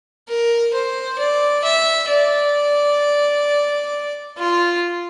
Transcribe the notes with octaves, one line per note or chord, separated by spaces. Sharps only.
A#4
C5
D5
E5
D5
F4